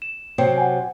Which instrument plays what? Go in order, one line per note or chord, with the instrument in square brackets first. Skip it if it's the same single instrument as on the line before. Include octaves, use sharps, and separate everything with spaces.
[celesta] E7
[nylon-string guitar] C3 F#3 C4
[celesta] F#5 G#5